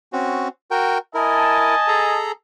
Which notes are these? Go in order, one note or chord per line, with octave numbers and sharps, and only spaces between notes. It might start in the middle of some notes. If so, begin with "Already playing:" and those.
C4 C#4 F#4
F#4 A#4 G5
E4 A#4 D#5 G#5 A5
G#4 A4 A#5